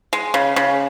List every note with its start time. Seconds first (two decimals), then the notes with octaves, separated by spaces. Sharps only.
0.13 G#3
0.34 C#3
0.56 C#3